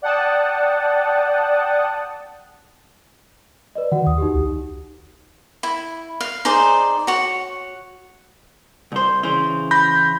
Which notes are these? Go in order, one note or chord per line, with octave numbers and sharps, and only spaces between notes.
D5 F#5 G5 A5 D#6
B4 D5 D#5
D#3 F#4 F#5
D#2 D#6
D#4 F#4 G4
C#2
E4
F5
D#4 G#4 C5 D5
F#4 C#5
C2 C5
C#3 E3 C5
B5 G6 A#6